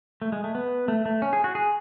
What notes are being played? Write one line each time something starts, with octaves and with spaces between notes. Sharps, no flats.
A3
G#3
A3
B3
A3
A3
C#4
G#4
F#4
G#4